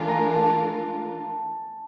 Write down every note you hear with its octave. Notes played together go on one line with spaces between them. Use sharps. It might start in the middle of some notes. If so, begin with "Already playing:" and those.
Already playing: E3 A3 D4 F4 A#4 G#5 A5
A#5
A5